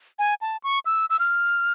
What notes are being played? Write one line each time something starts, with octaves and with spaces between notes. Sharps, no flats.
G#5
A5
C#6
E6
E6
F6